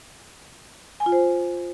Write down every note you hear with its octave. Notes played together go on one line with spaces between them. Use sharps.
G#5
F4
C5